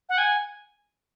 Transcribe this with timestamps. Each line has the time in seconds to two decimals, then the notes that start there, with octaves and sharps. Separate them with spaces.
0.09 F#5
0.18 G#5